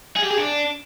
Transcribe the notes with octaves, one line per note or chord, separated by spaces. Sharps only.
G#4
G4
G#4
D4